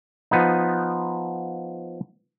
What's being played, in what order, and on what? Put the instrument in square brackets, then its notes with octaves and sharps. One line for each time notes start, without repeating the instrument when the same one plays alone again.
[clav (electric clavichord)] F3 B3 D#4